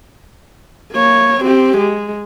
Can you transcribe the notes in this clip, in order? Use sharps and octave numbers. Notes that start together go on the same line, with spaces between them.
A#3 C#5
C4 G4
G#3